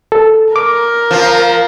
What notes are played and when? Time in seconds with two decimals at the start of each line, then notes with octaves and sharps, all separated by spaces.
0.12 A4
0.56 A#4 D6
1.11 F3